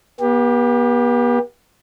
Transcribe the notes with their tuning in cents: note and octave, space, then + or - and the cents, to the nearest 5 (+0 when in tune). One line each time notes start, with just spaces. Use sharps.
B3 -40 G4 +20